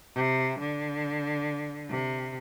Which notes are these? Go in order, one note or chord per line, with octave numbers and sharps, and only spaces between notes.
C3
D3
C3